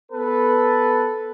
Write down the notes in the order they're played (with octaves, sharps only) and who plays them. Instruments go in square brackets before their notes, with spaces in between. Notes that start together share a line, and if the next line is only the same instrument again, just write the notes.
[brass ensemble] B3 A4 B4